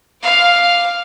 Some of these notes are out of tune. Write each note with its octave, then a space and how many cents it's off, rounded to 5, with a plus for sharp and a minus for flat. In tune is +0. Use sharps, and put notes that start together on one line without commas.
F5 +0 D6 +0